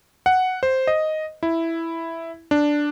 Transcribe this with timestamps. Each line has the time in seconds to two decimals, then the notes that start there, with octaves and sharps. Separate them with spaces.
0.26 F#5
0.63 C5
0.87 D#5
1.43 E4
2.51 D4